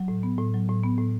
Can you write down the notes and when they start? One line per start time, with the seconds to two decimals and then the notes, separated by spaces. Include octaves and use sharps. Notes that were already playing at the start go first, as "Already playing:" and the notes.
Already playing: F#3
0.08 A2
0.23 B3
0.38 A2
0.54 F#3
0.69 A2
0.83 B3
0.98 A2